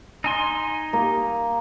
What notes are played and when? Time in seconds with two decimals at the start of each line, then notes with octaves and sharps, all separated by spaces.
0.24 D#4 G#5 C6
0.93 A#3